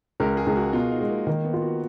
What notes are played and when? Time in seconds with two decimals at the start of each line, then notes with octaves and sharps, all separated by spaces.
0.20 C#2 A#4
0.37 G#4
0.47 C#2
0.56 F#4
0.73 B2 F4
0.92 D#4
1.00 G#3
1.09 A#3
1.27 D#3 A#3
1.44 B3
1.54 F4
1.62 F#4